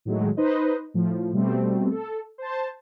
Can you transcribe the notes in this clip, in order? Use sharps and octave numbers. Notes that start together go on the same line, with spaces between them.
A2 D#3 F#3 G#3 A3
D#4 B4 C5 D#5
A2 F3
B2 G3 A3 C4
A4
C5 A5